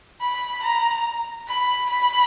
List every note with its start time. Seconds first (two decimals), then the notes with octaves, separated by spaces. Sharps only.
0.21 B5
0.63 A#5
1.48 B5
1.90 B5